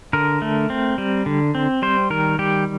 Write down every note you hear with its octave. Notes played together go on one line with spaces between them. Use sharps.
D3 A#4
A3
C4
G3
D3
C4
G3 C5
D#3 A#4
G3 G4